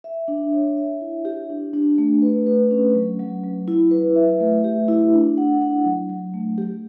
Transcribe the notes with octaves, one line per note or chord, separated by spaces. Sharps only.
E5
D4
C#5
E5
E4
G4
D4
D4
A3
B4
B4
C#4
F#3
F#3
F#3
E4
B4
E5
A3
G4
E4
D4
F#5
F#5
F#3
F#3
A3
G4